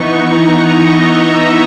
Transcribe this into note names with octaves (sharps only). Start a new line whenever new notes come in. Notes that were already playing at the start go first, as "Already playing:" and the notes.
Already playing: E3 B3 D#4 C#6
A#5
D#5
E5